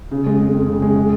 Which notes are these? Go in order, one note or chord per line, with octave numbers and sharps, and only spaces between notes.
C#3
G#3
F2
F2
C#3
G#3
G#3